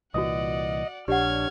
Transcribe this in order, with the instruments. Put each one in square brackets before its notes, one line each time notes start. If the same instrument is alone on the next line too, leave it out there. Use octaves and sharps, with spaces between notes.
[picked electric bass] C2 A#2 E3 [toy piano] F#4 D#6 [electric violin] D5 F#5 [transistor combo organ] D#5
[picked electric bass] A#1 [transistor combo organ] D4 C#5 [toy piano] G4 D5 F#5 [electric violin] F6 G#6